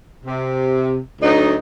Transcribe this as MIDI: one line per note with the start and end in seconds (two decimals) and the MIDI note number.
0.25 0.98 48
1.21 1.54 38
1.21 1.54 54
1.21 1.54 63